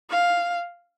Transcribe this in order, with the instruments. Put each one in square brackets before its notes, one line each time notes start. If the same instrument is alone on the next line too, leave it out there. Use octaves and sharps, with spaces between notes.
[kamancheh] F5